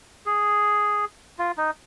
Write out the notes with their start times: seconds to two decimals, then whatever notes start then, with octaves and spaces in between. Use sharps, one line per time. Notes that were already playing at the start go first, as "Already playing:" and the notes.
0.26 G#4
1.38 F4
1.57 D#4